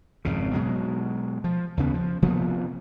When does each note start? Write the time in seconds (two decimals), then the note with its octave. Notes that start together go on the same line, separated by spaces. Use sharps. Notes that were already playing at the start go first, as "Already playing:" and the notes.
0.25 G#1 F2 C#3
0.53 B2 F#3 G#3
1.44 F3
1.77 D#2 C#3 B3
1.94 F3
2.22 C3 F3 A#3 B3